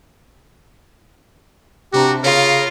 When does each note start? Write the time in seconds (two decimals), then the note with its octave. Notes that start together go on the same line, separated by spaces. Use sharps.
1.93 C3 D4 F#4 G4 A#5
2.24 C#3 F4 A#4 C#5